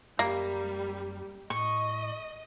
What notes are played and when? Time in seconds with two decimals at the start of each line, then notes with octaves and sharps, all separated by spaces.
0.19 F#2 G3 A#3
1.50 A2 D#5 C#6